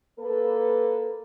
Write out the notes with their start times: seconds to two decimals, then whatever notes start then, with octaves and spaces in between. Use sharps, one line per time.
0.19 A#3 A4 B4